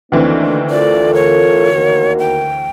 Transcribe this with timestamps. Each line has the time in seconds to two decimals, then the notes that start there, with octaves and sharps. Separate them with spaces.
0.12 D2 D#3 E3 A#3 C4 D4
0.70 F4 A4 A#4 D5
1.14 C#5
1.72 D#2 F#4 A#4
2.19 G5